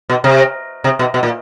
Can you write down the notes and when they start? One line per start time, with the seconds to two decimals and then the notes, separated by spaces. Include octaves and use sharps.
0.10 B2
0.24 C3
0.84 C3
0.99 B2
1.14 B2
1.23 A#2